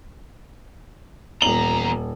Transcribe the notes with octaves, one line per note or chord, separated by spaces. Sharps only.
D#1 E2 A#5 F#7